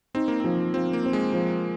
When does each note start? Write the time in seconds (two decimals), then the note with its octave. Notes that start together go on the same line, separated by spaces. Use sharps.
0.14 C4 D#4
0.28 A#3
0.40 F3 C4
0.74 F3 C4
0.93 A#3
1.04 C4
1.13 G#3
1.33 F3